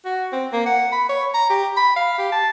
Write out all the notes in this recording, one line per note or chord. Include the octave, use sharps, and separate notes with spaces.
F#4
C4
A#3
F#5
B5
C#5
A#5
G4
B5
F5
G4
A5